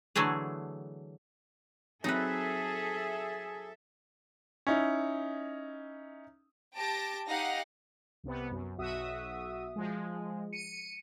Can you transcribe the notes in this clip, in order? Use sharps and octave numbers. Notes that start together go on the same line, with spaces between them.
D3 E3 F#3 A3 G#4
F#3 C4 D#4 G#4 A4 B4 E5
C#4 D#4 E4
G4 A5 A#6 D7
D#4 G4 F5 F#5 A#6
C2 C3 B3
F#2
B1 F#4 E5 D#6
F3 G#3
C#7 D#7